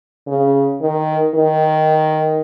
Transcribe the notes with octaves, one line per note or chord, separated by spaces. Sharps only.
C#3
D#3
D#3